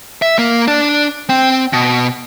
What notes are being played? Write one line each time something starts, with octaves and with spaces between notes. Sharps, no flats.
E5
A#3
D4
C4
B2